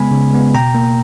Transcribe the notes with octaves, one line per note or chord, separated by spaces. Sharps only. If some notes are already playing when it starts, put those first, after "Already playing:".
Already playing: C#3 G#3 B3 G#5 B5
C#3
G#3 B3
B2 G5 A#5
A#3